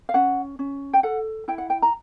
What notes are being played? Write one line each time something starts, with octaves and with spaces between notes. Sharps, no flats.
F5
C#4 F#5
C#4
G5
A4 F#5
E4 G5
F#5
G5
A#5